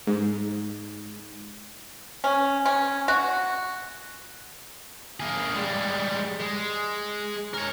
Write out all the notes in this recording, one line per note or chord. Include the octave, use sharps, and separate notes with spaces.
G#2
C#4
C#4
F#4
A#3 G#4
G3 G#3
G#3
A#4 C#5